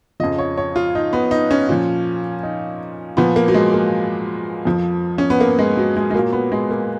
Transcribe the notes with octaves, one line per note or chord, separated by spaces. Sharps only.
F2 C#3 F3 D#5
C#5
C#5
F4
D#4
B3
D#4
C#4
A#2 F3
D#4
A#2 F3 B3
A#3
F#3
G#3
A#3
F2 F3
C#4
B3
A#3
G#3
F#3
G#3
G#3
A#2 F#3 A#3
B3
G#3
A#3